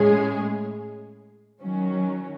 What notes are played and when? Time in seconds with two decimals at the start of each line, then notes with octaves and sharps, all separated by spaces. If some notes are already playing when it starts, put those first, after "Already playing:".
Already playing: A2 G#3 C#4 G#4
1.61 D#3 F#3 C#4